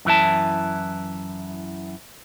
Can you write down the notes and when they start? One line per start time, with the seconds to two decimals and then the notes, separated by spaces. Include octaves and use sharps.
0.05 F#2 E3 E4 A5